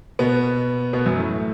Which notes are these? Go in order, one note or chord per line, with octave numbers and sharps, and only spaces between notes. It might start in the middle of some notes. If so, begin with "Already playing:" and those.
B2 B3
B2 B3
F#2 F#3
A2 A3